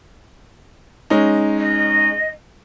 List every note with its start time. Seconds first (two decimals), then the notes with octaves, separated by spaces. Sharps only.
1.10 G#3 C#4 D#4
1.58 D#5